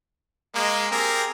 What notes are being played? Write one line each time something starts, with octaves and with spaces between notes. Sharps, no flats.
G#3 A#3
C4 G4 G#4 A#4